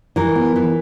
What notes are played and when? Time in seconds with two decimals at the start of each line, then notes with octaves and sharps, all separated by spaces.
0.16 E3 A#4
0.35 B3
0.56 E3